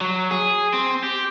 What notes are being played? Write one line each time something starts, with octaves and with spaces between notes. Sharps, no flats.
F#3
G#4
C4
G4